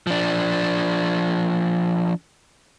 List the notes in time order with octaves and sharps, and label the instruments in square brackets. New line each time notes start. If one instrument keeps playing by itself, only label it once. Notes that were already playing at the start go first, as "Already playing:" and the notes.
[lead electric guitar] F3 D4